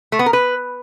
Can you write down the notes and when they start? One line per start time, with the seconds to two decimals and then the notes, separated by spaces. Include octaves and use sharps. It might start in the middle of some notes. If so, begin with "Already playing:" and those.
0.12 A3
0.19 B3
0.26 A#4
0.33 B4